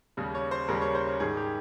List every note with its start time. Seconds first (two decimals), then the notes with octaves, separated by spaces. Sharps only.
0.17 D#2 C#3 G3
0.35 C#5
0.51 C5
0.68 D#2 C#3 G3 A#4
0.82 C#5
0.95 C5
1.07 C#5
1.20 G#2 D#3 G3 G#4
1.37 G4